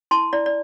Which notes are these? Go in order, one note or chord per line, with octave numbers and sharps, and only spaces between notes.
E4 A5 C6
E4 D5
D5